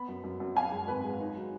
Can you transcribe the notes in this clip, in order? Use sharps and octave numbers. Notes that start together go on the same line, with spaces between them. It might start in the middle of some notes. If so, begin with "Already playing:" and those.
Already playing: B3 B5
F#2
F#2
F#2
F#2 F5 G#5
G#3
G#1 B4
G#3
D#4
F#3